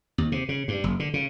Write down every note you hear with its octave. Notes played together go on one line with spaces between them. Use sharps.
D#2
C3
C#3
G2
F#1
D3
C#3